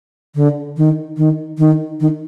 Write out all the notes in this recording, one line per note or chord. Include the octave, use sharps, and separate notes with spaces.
D3
D#3
D#3
D#3
D#3